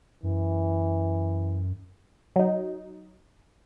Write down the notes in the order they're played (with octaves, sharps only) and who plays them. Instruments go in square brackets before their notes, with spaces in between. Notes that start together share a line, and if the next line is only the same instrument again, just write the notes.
[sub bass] F#2 [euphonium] E3
[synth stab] F#3 D#4